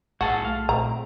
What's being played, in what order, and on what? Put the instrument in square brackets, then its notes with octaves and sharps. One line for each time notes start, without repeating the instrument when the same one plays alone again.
[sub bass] B1 [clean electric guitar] A2 G#4 A5 [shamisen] F#4 [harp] C6
[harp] A3 [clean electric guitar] F5
[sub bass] A#2 [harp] A3 C4 [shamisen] A#5